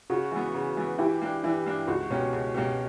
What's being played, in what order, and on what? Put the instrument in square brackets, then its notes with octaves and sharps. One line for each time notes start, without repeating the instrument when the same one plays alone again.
[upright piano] C#3 [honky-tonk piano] F#4
[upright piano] E3 B3
C#3
E3 B3
[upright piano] E3 [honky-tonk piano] E4 G4
[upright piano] A#3 D4
[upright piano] E3 [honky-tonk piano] E4
[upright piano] A#3 D4
[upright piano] C#2 [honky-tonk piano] F#4
[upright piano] B2 A#3 C#4 G4
C#2
B2 A#3 C#4 G4